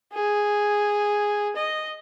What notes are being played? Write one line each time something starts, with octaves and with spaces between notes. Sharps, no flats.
G#4
D#5